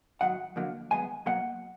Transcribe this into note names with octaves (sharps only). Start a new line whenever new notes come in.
G#2 D#3 F#3 F#5
F2 D3 F#3 A#3
F#2 D#3 G#3 B3 G#5
B1 B2 F#3 A#3 F#5